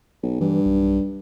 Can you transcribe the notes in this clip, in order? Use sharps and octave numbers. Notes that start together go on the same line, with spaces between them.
B1
G2 E3
B1